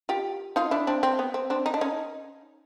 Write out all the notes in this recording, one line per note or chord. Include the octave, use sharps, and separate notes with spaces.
F4 G4
D#4 F4
D4 E4
C4 D4
C4
B3
C4
C4 D4
D#4
D4
C#4 D#4